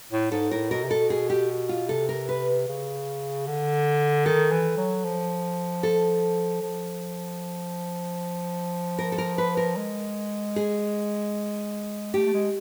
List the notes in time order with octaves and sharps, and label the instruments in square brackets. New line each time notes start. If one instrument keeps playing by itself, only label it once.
[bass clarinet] A2
[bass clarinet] G#2 [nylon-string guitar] A4
[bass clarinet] A2 [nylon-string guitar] A#4
[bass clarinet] B2 [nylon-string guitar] A#4
[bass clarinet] C3
[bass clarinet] B2 [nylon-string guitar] A4
[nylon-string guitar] G#4
G4
F4
[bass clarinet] C3 [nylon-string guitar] A4
[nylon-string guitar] A#4
B4
[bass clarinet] C#3
D3
[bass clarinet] D#3 [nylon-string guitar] A4
[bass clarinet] E3
F#3
F3
[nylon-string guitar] A4
[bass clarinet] F3
[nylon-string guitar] A#4
A4
A#4
B4
A#4
[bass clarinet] G#3
[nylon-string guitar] G#4
[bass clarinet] A3 [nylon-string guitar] G4
[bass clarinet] A3
G#3